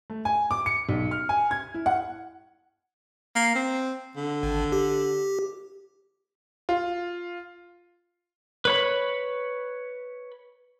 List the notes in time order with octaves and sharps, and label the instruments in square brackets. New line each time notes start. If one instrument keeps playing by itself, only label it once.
[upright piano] A3
G#5
D6
C#7
B1
F6
G#5
G#6
E4
F#5
[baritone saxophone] A#3
C4
D3
[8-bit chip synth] G#1
G4
[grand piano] F4
[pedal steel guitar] B4 C#5 B5